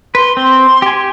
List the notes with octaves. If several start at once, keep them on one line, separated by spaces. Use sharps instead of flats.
B4 C6
C4 C6
G4 G#5